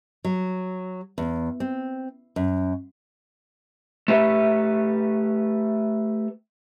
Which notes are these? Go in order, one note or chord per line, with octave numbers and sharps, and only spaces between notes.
F#3
E2
C4
F#2
A3 G4 B4 E5